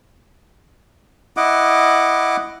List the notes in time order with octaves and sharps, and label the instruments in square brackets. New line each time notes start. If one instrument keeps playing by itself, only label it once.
[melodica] E4 D#5 F#5 D6